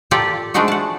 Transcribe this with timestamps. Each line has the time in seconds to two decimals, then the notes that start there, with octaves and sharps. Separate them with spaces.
0.11 F4 G4 A4 A#4 D5 G5
0.54 F3 G#3 A3 D4 D#4 F#4
0.68 F#5 A5